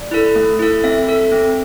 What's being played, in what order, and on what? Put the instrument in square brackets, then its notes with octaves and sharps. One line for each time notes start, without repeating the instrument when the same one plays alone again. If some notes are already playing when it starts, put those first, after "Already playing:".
Already playing: [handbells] D5
E4 A4
A3
E4 A4
C4 E5
A4
C4